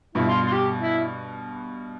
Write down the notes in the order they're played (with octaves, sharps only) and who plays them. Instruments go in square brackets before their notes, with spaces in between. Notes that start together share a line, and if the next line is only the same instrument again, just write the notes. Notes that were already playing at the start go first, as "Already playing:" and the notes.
[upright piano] G2 B2 [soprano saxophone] E4
[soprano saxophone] F4
F4
G4
E4